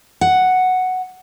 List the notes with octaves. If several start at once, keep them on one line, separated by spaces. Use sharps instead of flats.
F#5